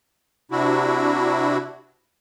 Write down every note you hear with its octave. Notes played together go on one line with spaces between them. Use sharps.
C3 D4 E4 F#4